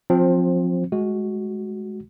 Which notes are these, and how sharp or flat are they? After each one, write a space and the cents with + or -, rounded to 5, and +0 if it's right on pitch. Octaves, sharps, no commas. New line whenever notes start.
F3 +20 C4 +10
G#3 +20 F#4 +0